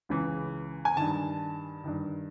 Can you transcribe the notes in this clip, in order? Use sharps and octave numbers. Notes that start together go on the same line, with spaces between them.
C#2 C#3 E3
G#5
G2 D#3 A5
G2 D#3